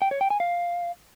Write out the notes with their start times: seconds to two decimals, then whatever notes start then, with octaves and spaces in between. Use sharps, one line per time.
0.02 G5
0.11 C#5
0.21 G5
0.30 G#5
0.40 F5